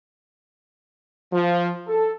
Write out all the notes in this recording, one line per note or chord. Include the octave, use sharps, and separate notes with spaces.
F3
A4